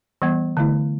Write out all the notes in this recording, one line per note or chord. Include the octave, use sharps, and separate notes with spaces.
E3 G3 B3
D3 A3 E4